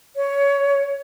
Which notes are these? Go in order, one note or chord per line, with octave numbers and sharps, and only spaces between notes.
C#5